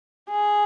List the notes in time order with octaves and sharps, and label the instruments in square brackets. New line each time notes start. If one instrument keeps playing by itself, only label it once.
[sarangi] G#4